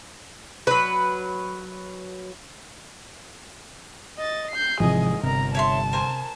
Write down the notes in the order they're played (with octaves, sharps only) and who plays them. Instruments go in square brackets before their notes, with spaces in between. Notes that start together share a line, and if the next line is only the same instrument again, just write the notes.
[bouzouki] F#3 B4
[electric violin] D#5 A6
G6 C7
[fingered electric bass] G#1 G#2 E3 [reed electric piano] C3 F3 [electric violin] G#4 D#5
[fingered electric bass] G1 [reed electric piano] C3 [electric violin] A#4 A#5
[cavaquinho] C#5 E5 C6 [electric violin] A5
[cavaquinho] A#4 C5 G#5